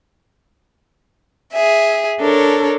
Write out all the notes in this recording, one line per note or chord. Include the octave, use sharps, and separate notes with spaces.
G#4 E5
D4 A4 A#4 C#5